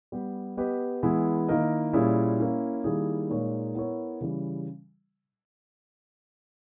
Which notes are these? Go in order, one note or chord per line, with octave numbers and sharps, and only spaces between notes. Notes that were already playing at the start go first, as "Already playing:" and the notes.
G3 B3 G4
B3 G4 B4 D#5
E3 G#3 B3 E4 G#4
D#3 A#3 E4 A#4 D#5
A#2 G3 C#4 E4 G#4
A#3 C#4 E4
D#3 G3 A#3 E4 G#4
A#2 G#3 D#4 A#4 C#5
B3 E4 A#4 C#5
C#3 E3 G3